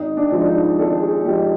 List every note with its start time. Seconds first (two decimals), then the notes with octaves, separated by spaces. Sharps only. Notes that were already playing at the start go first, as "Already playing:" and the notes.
Already playing: G#1 D#4
0.17 D4
0.32 G#2 F3
0.48 D#4
0.78 G#1 A4
1.02 G#4
1.25 G#2 F3 G4